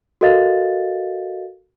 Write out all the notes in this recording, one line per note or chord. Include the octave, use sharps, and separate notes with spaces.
F#4 A4 A#4 D#5 F5 A6